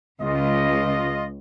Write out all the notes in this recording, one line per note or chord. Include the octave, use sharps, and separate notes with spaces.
C#2 F4 D#5